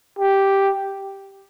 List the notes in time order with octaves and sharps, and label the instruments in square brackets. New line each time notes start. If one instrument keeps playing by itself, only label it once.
[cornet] G4